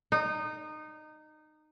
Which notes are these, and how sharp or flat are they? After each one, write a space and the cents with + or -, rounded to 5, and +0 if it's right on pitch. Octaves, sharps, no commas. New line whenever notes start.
D#4 -20